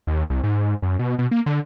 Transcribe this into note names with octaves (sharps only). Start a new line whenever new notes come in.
D#2
C2
G#2
F#2
B2
B2
A#3
D3